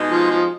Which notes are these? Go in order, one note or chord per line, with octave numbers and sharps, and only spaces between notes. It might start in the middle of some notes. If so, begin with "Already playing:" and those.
Already playing: B2 G#3 D#4 G#4
F3
F3